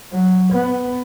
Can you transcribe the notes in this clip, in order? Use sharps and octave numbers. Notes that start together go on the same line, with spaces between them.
F#3
B3